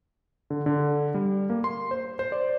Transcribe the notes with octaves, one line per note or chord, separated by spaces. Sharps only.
D3
D3
G3
A#3
C6
C5
C5
D5